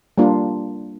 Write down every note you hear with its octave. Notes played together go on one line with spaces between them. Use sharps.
G3 A#3 D4 F4